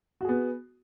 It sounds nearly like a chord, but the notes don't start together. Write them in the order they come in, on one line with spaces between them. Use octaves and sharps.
F#4 G#4 B3